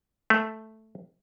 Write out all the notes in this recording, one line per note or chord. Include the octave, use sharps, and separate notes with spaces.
A3